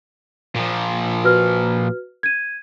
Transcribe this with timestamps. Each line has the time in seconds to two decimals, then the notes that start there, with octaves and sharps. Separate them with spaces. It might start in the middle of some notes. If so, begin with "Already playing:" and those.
0.55 A#2 F3
1.24 F#4 B4 F6
2.23 G#6 D#7